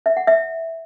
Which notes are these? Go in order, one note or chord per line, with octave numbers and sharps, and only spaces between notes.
E5
F#5
E5